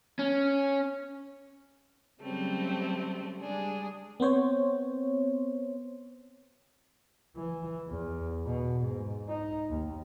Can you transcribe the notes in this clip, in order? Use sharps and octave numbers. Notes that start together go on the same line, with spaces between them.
C#4
C#3 F#3 G3 A3 C4
G3 G#3 D4 G#4
B3 C4 C5 C#5
E3
E2
B2
G#2
D#4
D#2